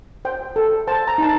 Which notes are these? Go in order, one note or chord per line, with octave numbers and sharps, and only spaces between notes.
C5 G5
A4
C5 A5
A#5
D#4 A5